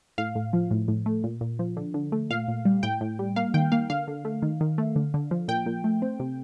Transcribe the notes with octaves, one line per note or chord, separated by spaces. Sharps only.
A2 F5
A2
F3
A2
A2
A3
A#2
A#2
F3
D3
D3
A3
A#2 F5
A#2
G3
A2 G5
A2
G3
A#3 F5
D#3 G5
A#3 F5
D3 F5
D3
A3
D#3
D#3
A3
D3
D3
F3
A#2 G5
A#2
A3
C4
C3